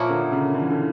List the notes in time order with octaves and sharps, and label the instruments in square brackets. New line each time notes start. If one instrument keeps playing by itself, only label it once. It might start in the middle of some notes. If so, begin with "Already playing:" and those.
Already playing: [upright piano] A#2 [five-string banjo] F3 A#3 E4 A#4 C#5
[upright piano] D3
C#3
D3
E3
D3